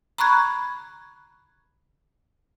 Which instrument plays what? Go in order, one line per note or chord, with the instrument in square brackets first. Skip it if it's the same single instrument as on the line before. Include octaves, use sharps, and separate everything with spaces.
[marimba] A#5 B5 C#6 F#6 G#6